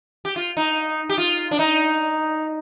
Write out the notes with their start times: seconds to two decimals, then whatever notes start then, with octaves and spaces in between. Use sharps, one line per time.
0.25 G4
0.36 F4
0.57 D#4
1.09 G4
1.18 F4
1.51 D4
1.59 D#4